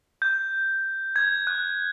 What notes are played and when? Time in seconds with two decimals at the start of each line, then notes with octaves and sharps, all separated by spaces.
0.22 G6
1.16 G#6
1.47 F#6